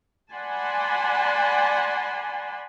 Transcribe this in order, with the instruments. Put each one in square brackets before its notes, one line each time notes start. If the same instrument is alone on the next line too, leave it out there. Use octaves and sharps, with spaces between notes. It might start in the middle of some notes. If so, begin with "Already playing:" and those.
[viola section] D5 F#5 G#5 A5 B5 C6